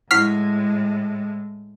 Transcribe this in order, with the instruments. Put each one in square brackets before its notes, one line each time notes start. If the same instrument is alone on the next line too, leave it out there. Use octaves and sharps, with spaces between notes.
[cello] A2 G#3 [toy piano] E4 F#5 C#6 [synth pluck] F6 B6 C7